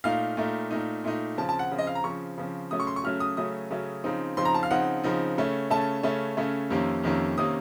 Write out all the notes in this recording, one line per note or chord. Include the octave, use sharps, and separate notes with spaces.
A#2 A3 D#4 F5
A#2 A3 D#4
A#2 A3 D#4
A#2 A3 D#4
C#3 F3 C4 A5
A5
F#5
C#3 F3 C4
D#5
F5
A#5
C#3 F3 C4 C#6
C#3 F3 C4
C#3 F#3 A3 C#4 D#6
C#6
C6
C#6
C#3 F#3 A3 C#4 F6
D#6
C#3 F#3 A3 C#4 D#6
C#3 F#3 A3 C#4
C#3 F3 C4 D#4
C#3 F3 C4 D#4 C6
A#5
A5
F5
C#3 F3 C4 D#4 F#5
C#3 F3 C4 D#4
C#3 A3 C#4
C#3 A3 C#4 A5
C#3 A3 C#4
C#3 A3 C#4
F2 C3 D#3 A#3 C#4
F2 C3 D#3 A#3 C#4
C3 D#3 A#3 C#4 D#6